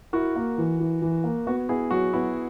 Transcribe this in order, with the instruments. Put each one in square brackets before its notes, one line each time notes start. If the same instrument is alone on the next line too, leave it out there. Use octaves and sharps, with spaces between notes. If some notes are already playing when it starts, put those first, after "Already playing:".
[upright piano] E4 [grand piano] F#4 A#4
[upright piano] A#3
E3
E3
E3
A#3
[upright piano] B3 [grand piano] F#4
[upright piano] B3 [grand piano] E4 G#4
[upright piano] F#3 [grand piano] F#4
[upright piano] B3 [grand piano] E4